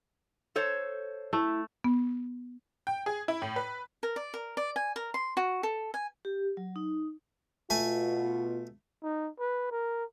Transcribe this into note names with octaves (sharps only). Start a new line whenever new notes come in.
A4 C5 C#5
A3 E4
B3
G5
G#4
E4
A2
B4
A#4
D5
A#4
D5
G#5
A#4
C6
F#4
A4
G#5
G4
F#3
D#4
B2 A3 F4 G#5
D#4
B4
A#4